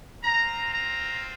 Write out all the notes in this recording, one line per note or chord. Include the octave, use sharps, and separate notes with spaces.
C4 F4 A#5
A#5